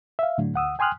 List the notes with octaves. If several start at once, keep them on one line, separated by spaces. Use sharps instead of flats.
E5 F5
A2 D3 F#3 A3
D2 F#5 D#6 E6
G5 G#5 C6 D#6 F6 F#6